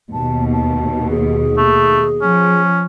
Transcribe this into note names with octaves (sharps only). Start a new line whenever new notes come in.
D#2 B2 A5
A5
G#4
A3
F3 C#4